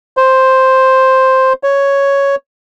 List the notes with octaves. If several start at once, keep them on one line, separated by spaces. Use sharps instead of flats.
C5
C#5